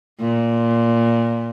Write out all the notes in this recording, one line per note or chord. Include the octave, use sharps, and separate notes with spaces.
A#2